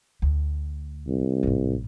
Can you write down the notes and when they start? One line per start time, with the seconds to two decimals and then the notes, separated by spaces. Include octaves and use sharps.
0.22 D2
1.08 C2
1.43 A1 G#2